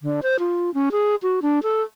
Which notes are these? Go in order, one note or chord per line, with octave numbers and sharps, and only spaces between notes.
D3
C5
F4
C#4
G#4
F#4
D4
A4